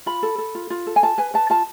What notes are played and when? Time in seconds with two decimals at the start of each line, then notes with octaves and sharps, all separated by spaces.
0.06 F4 B5
0.23 A4
0.38 A4
0.55 F4
0.70 F4
0.87 A4
0.96 G#5
1.03 F4 A5
1.18 B4 G#5
1.34 B4 A5
1.50 F4 A5